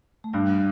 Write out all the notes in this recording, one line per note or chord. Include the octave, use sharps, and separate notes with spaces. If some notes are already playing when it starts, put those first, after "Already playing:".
A3
G2 G3